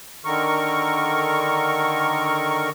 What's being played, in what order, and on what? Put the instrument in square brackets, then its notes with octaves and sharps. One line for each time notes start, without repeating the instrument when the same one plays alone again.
[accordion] D3 D#3 A#4 C#6